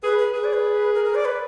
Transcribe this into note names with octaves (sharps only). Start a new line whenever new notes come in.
G#4 B4
B4
G#4 B4
D5
B4
A#4
A#4
D5
B4